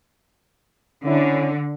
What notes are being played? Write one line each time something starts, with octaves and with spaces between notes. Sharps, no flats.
D3 C#4 E4